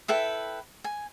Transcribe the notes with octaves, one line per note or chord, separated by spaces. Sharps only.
E4 A4 B4 G5
G#5